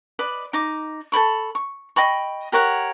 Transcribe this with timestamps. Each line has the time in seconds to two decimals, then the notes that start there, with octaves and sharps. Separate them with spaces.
0.19 B4 D5 D#5 B5
0.53 D#4 D6
1.12 A4 C5 B5 C#6
1.55 C#6
1.96 D#5 G5 B5 C#6
2.52 G4 A#4 C#5 F#5